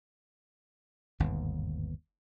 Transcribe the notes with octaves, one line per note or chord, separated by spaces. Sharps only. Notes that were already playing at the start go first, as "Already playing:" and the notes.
G1 D#2 G#2 B2